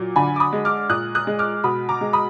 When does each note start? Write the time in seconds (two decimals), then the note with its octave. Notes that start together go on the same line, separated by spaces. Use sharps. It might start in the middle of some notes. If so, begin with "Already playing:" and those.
Already playing: A#2 F#3
0.16 D3 G#5 B5
0.36 D6
0.40 B5 D#6
0.53 G#3
0.65 D6 F6
0.90 A#2 D#6 F#6
1.15 D#6 F#6
1.27 G#3
1.39 D6 F6
1.64 B2 B5 D#6
1.89 A#5 D6
2.01 G#3
2.13 B5 D#6